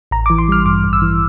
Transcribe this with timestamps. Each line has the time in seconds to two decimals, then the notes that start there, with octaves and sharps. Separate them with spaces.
0.11 A1 A#5
0.26 D6
0.30 E3
0.38 C6
0.48 G3 F6
0.66 G2 D6
0.84 A1
0.93 E6
1.02 E3